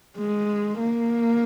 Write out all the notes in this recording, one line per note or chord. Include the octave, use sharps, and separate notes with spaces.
G#3
A#3